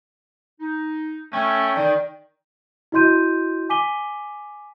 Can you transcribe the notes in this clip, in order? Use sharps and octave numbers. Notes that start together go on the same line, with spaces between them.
D#4
A3 C#4 G5
D#3 D5
E4 F#4 D#5 C6 G6 D#7
G#5 D6 B6 D#7 G7